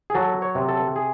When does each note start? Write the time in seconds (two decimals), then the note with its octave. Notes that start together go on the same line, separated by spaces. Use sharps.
0.10 G#4
0.15 F#3 A4
0.42 C#5
0.55 C3
0.69 A4
0.96 G#4